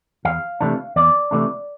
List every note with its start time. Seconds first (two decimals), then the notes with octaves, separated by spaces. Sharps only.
0.25 E2 F5
0.61 C3 E3 A3 D4
0.96 E2 D5
1.31 C3 E3 A3 D4